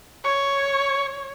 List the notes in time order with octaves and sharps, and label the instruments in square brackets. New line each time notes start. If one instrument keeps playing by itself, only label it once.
[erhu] C#5 [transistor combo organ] C#6